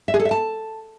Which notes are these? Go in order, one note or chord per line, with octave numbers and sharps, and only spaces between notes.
E5
G#4
A4
E5
A5